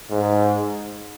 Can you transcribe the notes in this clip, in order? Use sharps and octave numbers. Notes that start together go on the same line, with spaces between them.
G#2